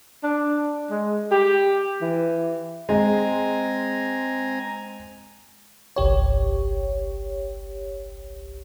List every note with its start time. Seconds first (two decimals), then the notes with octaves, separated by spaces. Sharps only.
0.23 D4
0.90 G#3
1.31 G4
2.01 E3
2.89 G#3 C4 G#5 A#5
5.96 G1 C2 G4 C#5